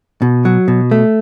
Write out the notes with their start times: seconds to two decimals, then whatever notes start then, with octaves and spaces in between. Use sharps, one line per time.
0.22 B2
0.45 F#3
0.68 B2
0.91 A3